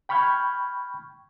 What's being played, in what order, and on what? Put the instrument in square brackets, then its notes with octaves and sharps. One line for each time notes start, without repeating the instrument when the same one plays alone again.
[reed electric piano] G5 B5 C#6 F6 G6 G#6